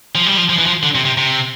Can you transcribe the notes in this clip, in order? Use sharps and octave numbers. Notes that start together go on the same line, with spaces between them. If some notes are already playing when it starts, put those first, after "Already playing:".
F3
G3
F3
F3
E3
F3
D3
C3
C3
C3